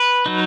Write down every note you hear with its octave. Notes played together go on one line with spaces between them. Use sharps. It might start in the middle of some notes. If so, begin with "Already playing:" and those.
Already playing: B4
F#3 D#4